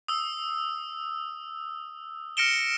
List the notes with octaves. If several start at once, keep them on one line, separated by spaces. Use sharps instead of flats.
D#6 E6
F6 A#6 C#7 D7 E7 G7